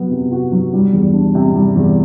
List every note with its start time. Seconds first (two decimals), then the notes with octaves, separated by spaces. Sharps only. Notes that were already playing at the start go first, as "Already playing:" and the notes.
Already playing: C3 F#3 B3
0.11 C3
0.32 F#4
0.52 F#3
0.73 G3
0.93 E2
1.13 D4
1.35 C3
1.54 G3
1.76 E2